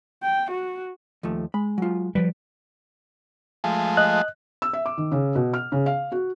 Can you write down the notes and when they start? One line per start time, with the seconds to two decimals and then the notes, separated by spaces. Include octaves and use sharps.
0.22 G5
0.51 F#4
1.23 D#2 F3 A3
1.54 G#3 B5
1.78 F#3 F4
2.15 F3 G3 B4
3.64 F3 G#3 A3
3.97 D#5 F#6
4.62 E6
4.73 E5
4.86 D6
4.98 D#3
5.12 C#3
5.35 B2
5.54 F6
5.72 C#3
5.86 F5
6.12 F#4